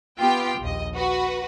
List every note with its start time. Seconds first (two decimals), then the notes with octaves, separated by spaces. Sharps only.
0.20 B3 F4 G4 G5
0.60 A#1 D#2 D#5
0.95 F#4 B4